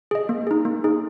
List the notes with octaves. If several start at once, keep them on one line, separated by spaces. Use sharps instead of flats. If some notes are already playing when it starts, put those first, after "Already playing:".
G#4 D#5
A#3
D#4 G#4
A#3
D#4 G#4